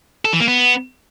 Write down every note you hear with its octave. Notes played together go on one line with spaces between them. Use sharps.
A4
E3
A#3
B3